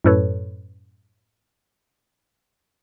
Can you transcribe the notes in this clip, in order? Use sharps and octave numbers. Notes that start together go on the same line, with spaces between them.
F#2 A2 A4 B4 C#5